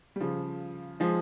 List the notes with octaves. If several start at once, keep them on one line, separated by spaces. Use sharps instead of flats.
G3
C#3 F3
F3 G#3